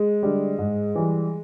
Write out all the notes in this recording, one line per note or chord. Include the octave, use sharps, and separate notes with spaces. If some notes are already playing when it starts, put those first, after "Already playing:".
Already playing: G#3
D3 G3
G#2
E3 G3